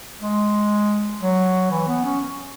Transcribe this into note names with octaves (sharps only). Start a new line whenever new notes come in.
G#3
F#3
E3
B3
C#4